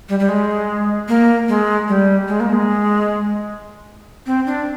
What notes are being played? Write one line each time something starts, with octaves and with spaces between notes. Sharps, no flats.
G3
G3
G#3
A#3
G#3
G3
G#3
A#3
G#3
C4
D4